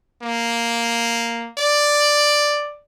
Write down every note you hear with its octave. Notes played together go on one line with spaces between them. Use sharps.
A#3
D5